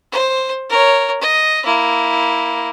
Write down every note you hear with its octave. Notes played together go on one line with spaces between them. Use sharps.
C5
A#4 C#5
D#5
A#3 E4